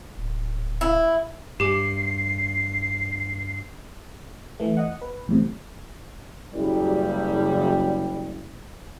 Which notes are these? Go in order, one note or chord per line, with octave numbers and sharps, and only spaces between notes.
D1
E4
G2 G4 D6 C7
E3 A3
D#5 F#5
B4
B1 E2 A2 C3
F#1 G3